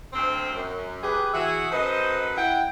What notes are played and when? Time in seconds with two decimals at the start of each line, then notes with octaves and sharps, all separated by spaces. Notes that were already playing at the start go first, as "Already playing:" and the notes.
0.13 D2 C4
0.53 F#2
1.03 G4 G#4 B4
1.33 E3 F#4 G#4 E5
1.72 F#2 A4 B4 C5 D#5
2.37 E4 F#5 G5